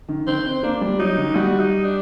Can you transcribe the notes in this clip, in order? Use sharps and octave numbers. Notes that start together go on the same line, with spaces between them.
D#3
D#3 C5
C4
A#3 D4
G3
F#3 D#4
D#3
G3 F#4
D#4
D4